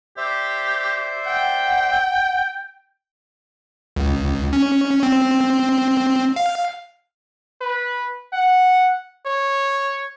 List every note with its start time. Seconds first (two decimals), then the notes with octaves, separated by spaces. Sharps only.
0.17 G4 C5 D5 E5
1.25 F#5 G5
3.96 C#2
4.53 C#4
5.03 C4
6.36 F5
7.61 B4
8.33 F#5
9.26 C#5